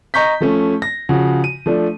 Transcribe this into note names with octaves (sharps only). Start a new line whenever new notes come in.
D#5 A#5 C#6 G6 B6
F3 A3 C#4
A#6
C#3 F3 F#4
D#7
F3 A3 D4